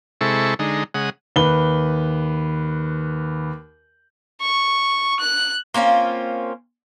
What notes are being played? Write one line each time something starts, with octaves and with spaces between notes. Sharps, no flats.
C3 G#3 E4 A4 C#6
D3 G#3 D#4
C#3 G#3 F#5 D#6
D#2 B4 G7
C#6
F#6
A#3 C4 C#4 F4